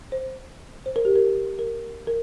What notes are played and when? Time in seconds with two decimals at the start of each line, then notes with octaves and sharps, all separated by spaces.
0.12 C5
0.86 C5
0.96 A#4
1.05 G4
1.16 A#4
1.59 A#4
2.07 A#4